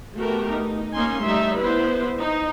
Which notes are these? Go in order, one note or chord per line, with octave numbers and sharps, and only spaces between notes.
A3 B3 F#4 G4 A#4
D#4
A#3 C#4 D#4 G#5 C6
G3 A3 D#4 E5
B3 E4 B4 C5
D#4